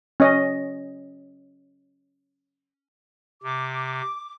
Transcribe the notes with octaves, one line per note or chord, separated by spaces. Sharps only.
C#4 D#5
C3 D6